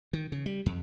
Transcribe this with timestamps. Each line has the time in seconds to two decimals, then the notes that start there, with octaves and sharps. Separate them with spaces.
0.13 D#3
0.32 C#3
0.46 G3
0.66 F2